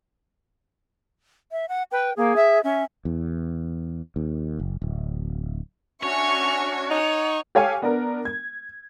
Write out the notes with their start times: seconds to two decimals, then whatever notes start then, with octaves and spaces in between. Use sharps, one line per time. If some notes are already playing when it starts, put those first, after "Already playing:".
1.52 E5
1.69 F#5
1.92 B4 G5
2.17 A#3 G#4
2.36 E5
2.64 C#4 E5
3.05 E2
4.16 D#2
4.59 F#1
4.82 D1
6.03 C#4 D4 F#4 C#5 E5 G#5 C#6
6.91 D#4 F#5
7.55 G4 A4 C#5 F5 G5 G#5
7.82 B3 D4 A#4
8.25 G#6